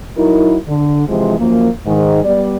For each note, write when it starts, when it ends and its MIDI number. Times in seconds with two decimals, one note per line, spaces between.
0.17 0.56 54
0.17 0.56 63
0.17 0.56 64
0.17 0.56 70
0.68 1.06 50
1.07 1.37 48
1.07 1.37 52
1.07 1.37 53
1.07 1.37 56
1.38 1.68 42
1.38 1.68 53
1.38 1.68 58
1.86 2.23 44
1.86 2.23 51
2.23 2.57 55
2.23 2.57 59
2.23 2.57 74